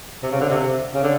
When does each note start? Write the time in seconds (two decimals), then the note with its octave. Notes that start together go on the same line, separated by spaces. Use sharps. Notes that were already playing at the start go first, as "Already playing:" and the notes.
0.23 C3
0.32 C#3
0.40 D3
0.50 C3
0.94 C#3
1.03 D3